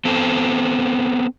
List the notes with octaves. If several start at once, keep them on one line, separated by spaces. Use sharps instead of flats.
B3 C4 A4